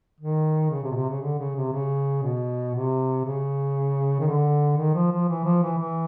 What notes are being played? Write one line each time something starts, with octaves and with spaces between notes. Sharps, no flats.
D#3
C#3
C3
B2
C3
C#3
D3
C#3
C3
C#3
B2
C3
C#3
D#3
D3
D#3
F3
F3
E3
F3
E3
E3